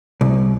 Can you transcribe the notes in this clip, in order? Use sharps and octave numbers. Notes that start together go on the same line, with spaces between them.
C2